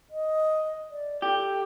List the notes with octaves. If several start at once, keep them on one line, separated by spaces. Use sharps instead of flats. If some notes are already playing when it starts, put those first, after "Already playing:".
D#5
D5
G4 A4